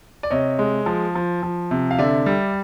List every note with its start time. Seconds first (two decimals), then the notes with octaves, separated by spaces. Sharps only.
0.23 D5
0.31 C3 C#5 D#5
0.59 G#3
0.86 F3
1.15 F3
1.43 F3
1.71 C3
1.91 F5
1.99 D3 D5 E5
2.26 G3